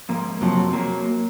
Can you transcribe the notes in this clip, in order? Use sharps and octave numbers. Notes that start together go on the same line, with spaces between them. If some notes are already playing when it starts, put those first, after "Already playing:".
G#2 F3 A#3
F2 C3 F3 F#3
F#3 A#3